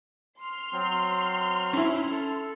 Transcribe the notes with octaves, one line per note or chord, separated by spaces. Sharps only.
C6 F6
F#3 C4
C#4 E4
A4